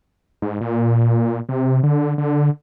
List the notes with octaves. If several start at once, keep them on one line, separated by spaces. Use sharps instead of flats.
G#2
A#2
C3
D3
D3